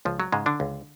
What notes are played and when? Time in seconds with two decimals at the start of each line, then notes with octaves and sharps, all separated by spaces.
0.05 C#2 F3
0.20 F#3
0.32 G#2 C#3 G#3
0.46 D3 D4
0.60 C#2